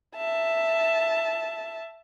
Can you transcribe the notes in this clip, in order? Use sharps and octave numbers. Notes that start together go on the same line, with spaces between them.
E5 A5